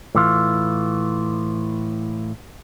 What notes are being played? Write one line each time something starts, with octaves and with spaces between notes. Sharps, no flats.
A2 E3 F4